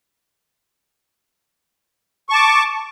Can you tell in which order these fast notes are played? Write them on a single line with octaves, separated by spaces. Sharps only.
C#6 A5 D6